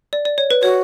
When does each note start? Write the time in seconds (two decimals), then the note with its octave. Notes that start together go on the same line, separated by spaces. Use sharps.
0.13 D5
0.25 D5
0.38 C#5
0.51 B4
0.62 F#4 C#5